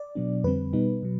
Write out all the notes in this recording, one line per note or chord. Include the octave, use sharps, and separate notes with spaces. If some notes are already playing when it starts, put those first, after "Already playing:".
Already playing: D5
B2 F#3 B3 D4
F2 D3 G3 C4 B4
B2 G3 B3 D#4
B2 F#3